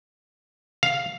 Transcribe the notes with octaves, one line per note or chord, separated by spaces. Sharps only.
F5